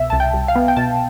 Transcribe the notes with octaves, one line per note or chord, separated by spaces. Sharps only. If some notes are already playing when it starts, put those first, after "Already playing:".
Already playing: C2 B2 E5
C2 A5
G5
C2
F5
B3
G5
B2 A5